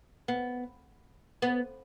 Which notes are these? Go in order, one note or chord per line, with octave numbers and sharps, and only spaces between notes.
B3
B3